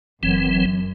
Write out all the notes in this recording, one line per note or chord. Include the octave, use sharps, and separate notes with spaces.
F#1 F#2 E3 C4